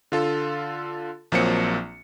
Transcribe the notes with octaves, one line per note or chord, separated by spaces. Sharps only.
D3 F4 A4
A#1 F3 F#3 A#3 C4 C#7